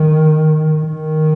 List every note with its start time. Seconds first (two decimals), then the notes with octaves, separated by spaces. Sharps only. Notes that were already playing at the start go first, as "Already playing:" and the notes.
Already playing: D#3
0.83 D#3